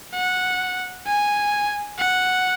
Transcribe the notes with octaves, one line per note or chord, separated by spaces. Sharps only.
F#5
G#5
F#5